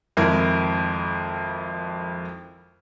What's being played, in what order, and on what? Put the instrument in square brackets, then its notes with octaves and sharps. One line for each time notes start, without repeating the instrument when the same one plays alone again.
[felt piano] G#1 F2 C4 E4 A#4 G#6